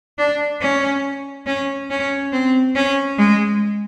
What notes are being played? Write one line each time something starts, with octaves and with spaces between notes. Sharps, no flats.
D4
C#4
C#4
C#4
C4
C#4
G#3